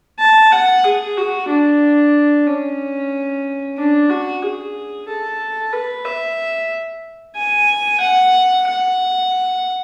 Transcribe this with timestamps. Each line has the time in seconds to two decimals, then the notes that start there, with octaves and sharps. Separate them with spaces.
0.19 A5
0.52 F#5
0.84 G#4
1.17 F#4
1.49 D4
2.47 C#4
3.78 D4
4.10 F#4
4.43 G#4
5.09 A4
5.73 B4
6.05 E5
7.36 G#5
8.01 F#5
8.67 F#5